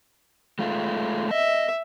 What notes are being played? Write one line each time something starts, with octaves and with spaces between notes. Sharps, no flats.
G#3 A3 F4
D#5 E5